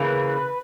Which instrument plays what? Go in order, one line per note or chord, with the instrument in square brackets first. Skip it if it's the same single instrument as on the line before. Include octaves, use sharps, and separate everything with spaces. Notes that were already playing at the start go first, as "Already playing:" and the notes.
Already playing: [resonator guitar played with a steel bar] C#3 E3 A#3 [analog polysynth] B4